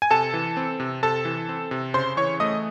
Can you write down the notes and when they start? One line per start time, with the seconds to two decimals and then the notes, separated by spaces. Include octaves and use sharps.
0.02 G#5
0.11 C3 A4 A5
0.34 E3
0.57 C4
0.80 C3
1.03 C3 A4 A5
1.25 E3
1.49 C4
1.71 C3
1.94 C#3 C5 C6
2.17 E3 C#5 C#6
2.40 A3 D#5 D#6